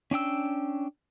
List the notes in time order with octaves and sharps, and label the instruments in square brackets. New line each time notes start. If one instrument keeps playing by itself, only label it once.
[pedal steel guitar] C#4 D4 G5 E6